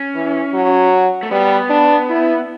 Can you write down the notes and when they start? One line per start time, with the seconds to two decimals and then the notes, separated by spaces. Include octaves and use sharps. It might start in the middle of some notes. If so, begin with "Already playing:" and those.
Already playing: C#4
0.15 E3
0.53 F#3
1.23 A3
1.31 G3 B3
1.70 D4
2.09 E4